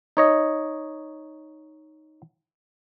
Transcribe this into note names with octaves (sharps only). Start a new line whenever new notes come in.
D#4 C#5 D#5